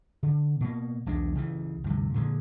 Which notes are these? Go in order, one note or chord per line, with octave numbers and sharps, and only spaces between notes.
D3
B2 A#3
B1 E2 G#3 D4
C#2 C#3 E3
D2 G2 C3
A#2 D3 G3 G#3